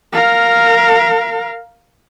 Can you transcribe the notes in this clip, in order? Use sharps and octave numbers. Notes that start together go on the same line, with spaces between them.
A#4 F5